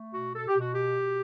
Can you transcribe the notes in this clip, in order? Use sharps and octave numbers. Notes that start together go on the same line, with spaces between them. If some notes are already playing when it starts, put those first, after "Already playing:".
Already playing: A3
B2 F#4
A4
G4
B2 F#4
G4
B2